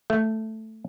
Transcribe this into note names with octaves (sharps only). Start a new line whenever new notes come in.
A3